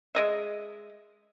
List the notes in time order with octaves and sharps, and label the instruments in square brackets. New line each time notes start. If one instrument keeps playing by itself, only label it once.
[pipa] G#3 D#5 E5